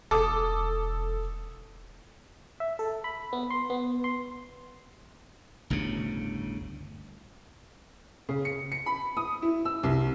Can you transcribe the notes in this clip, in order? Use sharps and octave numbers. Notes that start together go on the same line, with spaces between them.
E1 A4 D6 D#6
E5
A4
B5
B3
C6
B3
C6
G1 D2 A2 C#3
C#3
C#7
C#7
B5
D#6
E4
E6
C2